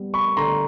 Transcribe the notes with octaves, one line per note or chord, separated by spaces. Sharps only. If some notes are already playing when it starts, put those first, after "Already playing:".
Already playing: G3 B3
B5 C#6
D3 A#5 C6